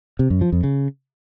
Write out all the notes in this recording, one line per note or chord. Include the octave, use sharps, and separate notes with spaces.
C3
F#2
F3
F2
C#3